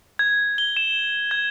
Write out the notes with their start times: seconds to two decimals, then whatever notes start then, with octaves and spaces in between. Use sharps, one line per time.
0.19 G#6
0.58 G7
0.77 E7
1.31 G#6